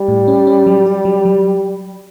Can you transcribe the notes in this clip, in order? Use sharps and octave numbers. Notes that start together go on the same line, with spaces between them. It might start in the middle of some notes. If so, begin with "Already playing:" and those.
Already playing: G3
A2
C#4
C#4
F#3
G4
F#3
F#3